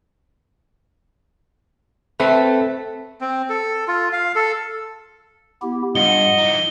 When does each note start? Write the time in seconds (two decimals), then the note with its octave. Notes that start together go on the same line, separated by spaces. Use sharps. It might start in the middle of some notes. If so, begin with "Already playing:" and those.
2.20 A3 C4 B4
3.21 C4
3.49 A4
3.88 F4
4.13 F5
4.36 A4
5.62 B3 E4 G4
5.95 G2 F4 D#5 F#5 G7
6.38 E3 D#4